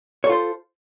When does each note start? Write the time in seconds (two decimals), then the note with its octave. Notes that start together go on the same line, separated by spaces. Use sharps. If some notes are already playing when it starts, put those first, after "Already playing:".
0.24 C#5
0.27 A4
0.29 F4
0.32 C5